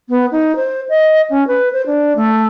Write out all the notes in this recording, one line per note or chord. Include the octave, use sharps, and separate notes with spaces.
B3
D#4
C5
D#5
C#4
B4
C5
D4
A3